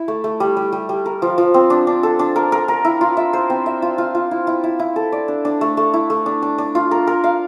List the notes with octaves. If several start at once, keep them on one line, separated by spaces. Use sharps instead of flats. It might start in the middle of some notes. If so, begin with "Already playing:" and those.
Already playing: E4
A3
A3
G3
G3
G3
G3
A#4
F3
F3
C4
D4
D4
A4
D4
A#4
A#4
A#4
E4
F4
E5
C5
C4
E5
F4
F4
F4
E4
E4
E4
E4
A4
D5
D4
D4
A3
A3
E4
A3
D4
D4
D4
F4
A#4
A#4
F5